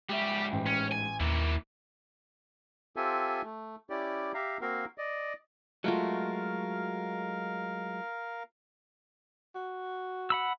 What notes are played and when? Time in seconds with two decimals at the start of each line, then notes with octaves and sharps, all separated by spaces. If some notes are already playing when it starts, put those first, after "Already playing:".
0.09 G#2 G3 G4 E5
0.52 A1 G5
0.66 C#4
0.92 G#5
1.20 D#2 A#3 E4
2.96 C4 F4 G4 A4 E5 G#5
3.44 A3
3.90 C#4 E4 G4 D5
4.34 G4 E5 F5 A#5
4.61 A#3 C4 F#4 A#4 F5
4.98 D5 D#5
5.84 F#3 G#3 A3 F4 F#4 A#4 F5
9.55 F#4
10.30 F#5 B5 E6